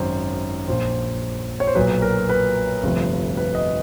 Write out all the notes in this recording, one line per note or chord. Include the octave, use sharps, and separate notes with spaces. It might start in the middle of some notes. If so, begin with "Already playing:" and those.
Already playing: G#1 F#2 D#3 C5
A#1 A#2 F3 C5
C#5
C5
B1 A#2 F#3 B4
A#4
B4
G1 F2 C3 F3 A3
B4
D#5